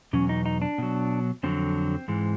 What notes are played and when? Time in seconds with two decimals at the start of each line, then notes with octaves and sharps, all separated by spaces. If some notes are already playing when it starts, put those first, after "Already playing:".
0.13 E2 B2 F#3 C#4
0.29 D#4
0.46 D#4
0.62 D4
0.78 B2 F#3
1.43 F2 D3 F#3 C4
2.08 G#2 E3 G#3